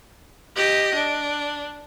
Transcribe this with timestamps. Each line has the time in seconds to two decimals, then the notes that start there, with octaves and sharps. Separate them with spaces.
0.56 G4 D#5
0.95 D4